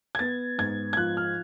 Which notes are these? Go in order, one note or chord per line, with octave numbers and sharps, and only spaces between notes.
G#6
B3 A6
G#2 G#6
G#6
F3 F#6
F6